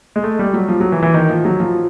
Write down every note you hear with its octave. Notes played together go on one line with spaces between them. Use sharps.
G#3
A3
G3
F#3
F3
F#3
E3
E3
D#3
F3
F#3
F3